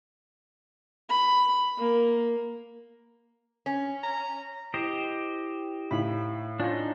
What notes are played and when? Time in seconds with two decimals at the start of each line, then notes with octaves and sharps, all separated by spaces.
1.09 B5
1.78 A#3
3.66 C#4
4.03 A#5
4.74 E4 G4 C5 D#5
5.91 A2 D#4 F5 B5
6.60 D4 D#4 F4 C#5 G#5